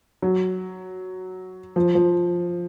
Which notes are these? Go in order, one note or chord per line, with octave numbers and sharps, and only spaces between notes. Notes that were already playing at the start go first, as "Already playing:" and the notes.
F#3
F3
F3